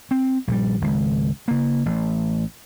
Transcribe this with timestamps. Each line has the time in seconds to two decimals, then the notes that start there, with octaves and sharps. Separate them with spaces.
0.11 C4
0.47 A#1 D3 G3
0.82 G#1 C#2
1.48 C#3 A#3
1.86 A1